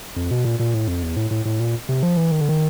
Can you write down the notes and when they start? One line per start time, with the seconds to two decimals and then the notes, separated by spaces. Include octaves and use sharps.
0.16 F2
0.31 B2
0.45 A#2
0.59 A#2
0.74 A2
0.88 F2
1.03 E2
1.17 A2
1.31 A2
1.45 A2
1.60 A#2
1.89 C3
2.03 F3
2.17 E3
2.31 D#3
2.40 D3
2.49 D#3